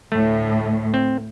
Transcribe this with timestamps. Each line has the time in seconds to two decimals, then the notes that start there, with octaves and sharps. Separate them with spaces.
0.12 D2 A2 A3
0.94 C4